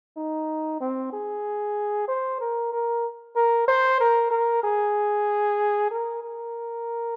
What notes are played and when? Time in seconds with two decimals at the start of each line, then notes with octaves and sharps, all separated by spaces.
0.17 D#4
0.81 C4
1.13 G#4
2.08 C5
2.40 A#4
2.72 A#4
3.36 A#4
3.68 C5
4.00 A#4
4.31 A#4
4.63 G#4
5.91 A#4
6.23 A#4